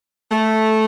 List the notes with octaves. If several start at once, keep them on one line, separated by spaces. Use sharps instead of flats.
A3